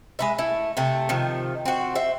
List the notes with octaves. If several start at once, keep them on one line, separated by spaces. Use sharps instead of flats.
G#3 B4 E5
A3 E4
C3 A3
C3 D#3 F3
C4 F#4
C5 E5